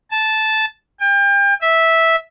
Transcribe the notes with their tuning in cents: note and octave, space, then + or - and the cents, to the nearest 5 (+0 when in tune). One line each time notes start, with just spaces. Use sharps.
A5 -10
G5 +35
E5 -10